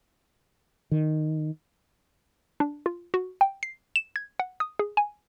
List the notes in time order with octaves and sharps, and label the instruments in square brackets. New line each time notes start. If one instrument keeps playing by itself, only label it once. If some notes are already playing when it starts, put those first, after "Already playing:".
[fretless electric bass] D#3
[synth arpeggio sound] D4
F4
F#4
G5
C7
E7
G#6
F#5
D#6
G#4
G#5